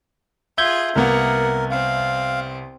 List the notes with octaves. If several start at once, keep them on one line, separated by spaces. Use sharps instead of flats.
F4 G#4 E5 G6 G#6
C2 A#3 B3 A#4 F#5
C4 F5